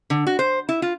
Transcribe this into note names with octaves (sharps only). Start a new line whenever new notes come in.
D3
F#4
C5
E4
F4